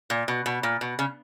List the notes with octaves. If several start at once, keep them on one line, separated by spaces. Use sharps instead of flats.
A#2
B2
B2
A#2
B2
C#3